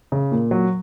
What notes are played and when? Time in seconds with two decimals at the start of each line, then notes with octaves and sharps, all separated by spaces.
0.12 C#3
0.32 A#2
0.51 F#3